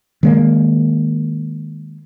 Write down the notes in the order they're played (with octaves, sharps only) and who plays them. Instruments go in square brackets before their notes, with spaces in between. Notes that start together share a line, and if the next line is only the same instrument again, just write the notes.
[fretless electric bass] D#3 G#3 A#3